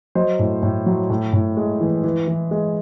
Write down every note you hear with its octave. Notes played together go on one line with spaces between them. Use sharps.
F#3 C5 D#5
A2
A2
F#3
A2
A2
G#3
E3
E3
E3
G#3